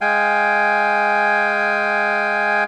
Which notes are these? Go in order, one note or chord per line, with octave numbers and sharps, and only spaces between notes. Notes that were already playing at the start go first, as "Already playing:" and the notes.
G#3 F5 G5 G#5